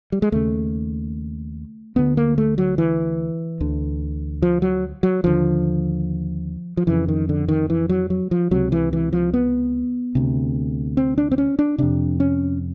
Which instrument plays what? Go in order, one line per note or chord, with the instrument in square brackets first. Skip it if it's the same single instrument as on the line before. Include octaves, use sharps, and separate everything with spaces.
[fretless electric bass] G3
G#3
D#2 C#3 A3
D2 D3 B3
A#3
A3
F#3
E3
D2 D3
F3
F#3
F#3
D#2 D3 F3
F3
F2 C#3 E3
D#3
D3
D#3
E3
F#3
F#3
F3
C#2 C3 F#3
E3
E3
F3
B3
D2 C3
C4
D4
C4
C#4
D4
F2 C3 D4
C#4